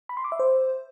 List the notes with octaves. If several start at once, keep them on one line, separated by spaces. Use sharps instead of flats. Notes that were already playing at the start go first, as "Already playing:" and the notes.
B5
C6
D6
E5
C5